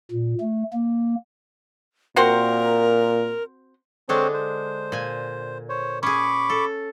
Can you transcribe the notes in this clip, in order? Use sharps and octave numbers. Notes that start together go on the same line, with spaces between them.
A#2
A3
A#3
A#2 C4 F#4 A#4 C5
D3 G#3 C4 D4 C5 C#5
C5
A#2 G#5
C5 C#5
C#4 G#4 B5 C#6 D6
A4